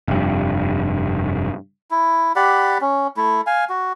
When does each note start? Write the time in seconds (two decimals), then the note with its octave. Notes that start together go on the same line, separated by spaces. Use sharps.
0.08 F1 G2
1.91 E4
2.36 G4 D5 F#5 B5
2.81 C#4
3.17 A3 E4
3.47 F5 G#5
3.69 F#4